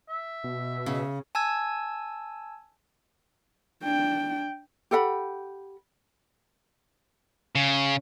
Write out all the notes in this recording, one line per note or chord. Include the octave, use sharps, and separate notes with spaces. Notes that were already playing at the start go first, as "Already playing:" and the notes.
E5
B2
C#3
G#5 A5 E6 G#6
D4 G5
G4 A4 F#5 B5
C#3